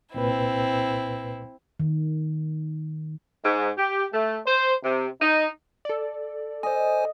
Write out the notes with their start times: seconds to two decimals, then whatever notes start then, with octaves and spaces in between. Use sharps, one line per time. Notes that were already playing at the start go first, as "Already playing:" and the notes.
0.14 C2 A#2 C4 E4 B4
1.80 D#3
3.45 G#2
3.78 G4
4.13 A3
4.47 C5
4.84 C3
5.21 D#4
5.85 A4 D5
6.63 C5 D#5 G#5